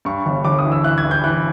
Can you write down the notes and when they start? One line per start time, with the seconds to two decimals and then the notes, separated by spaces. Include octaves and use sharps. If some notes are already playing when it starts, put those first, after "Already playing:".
0.05 G2 C#6
0.26 G1
0.44 G1 D6
0.59 D#6
0.65 E3
0.72 E6
0.84 E3 F#6
0.98 G#6
1.04 E3
1.11 G6
1.24 E3 F#6